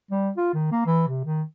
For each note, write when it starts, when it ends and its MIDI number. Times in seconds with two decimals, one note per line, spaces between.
0.11 0.30 55
0.37 0.51 65
0.54 0.70 51
0.72 0.84 58
0.86 1.03 52
1.08 1.23 48
1.25 1.43 51